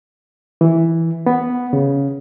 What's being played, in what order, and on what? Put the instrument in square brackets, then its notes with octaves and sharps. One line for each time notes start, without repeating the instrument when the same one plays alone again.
[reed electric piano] E3
B3
C#3